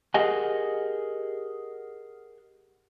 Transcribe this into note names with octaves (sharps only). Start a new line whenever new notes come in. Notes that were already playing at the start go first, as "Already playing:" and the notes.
G4 G#4 A#4 D#5 F#5 G#5